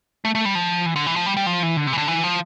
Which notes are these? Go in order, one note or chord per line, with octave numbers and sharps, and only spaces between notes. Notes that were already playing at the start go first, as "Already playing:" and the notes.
A3
A3
G3
F3
E3
D3
E3
F3
G3
G3
F3
E3
D3
C3
E3
D3
E3
F3